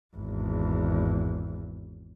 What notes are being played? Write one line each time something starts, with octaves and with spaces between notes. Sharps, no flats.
G#1 E2